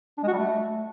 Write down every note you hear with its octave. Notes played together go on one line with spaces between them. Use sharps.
D4
G#3
F#4
G3
A3